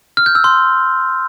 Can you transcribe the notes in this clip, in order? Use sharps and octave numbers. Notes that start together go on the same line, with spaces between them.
F6
G6
E6
C6